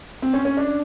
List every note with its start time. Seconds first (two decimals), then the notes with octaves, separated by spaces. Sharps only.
0.22 C4
0.34 C#4
0.45 C#4
0.57 D4